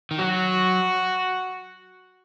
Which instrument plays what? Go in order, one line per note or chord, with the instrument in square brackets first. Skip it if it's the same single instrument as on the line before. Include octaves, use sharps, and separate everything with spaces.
[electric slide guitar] D#3
[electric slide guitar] F#3 [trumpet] F#4